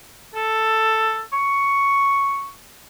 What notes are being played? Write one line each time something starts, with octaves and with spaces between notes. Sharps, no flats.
A4
C#6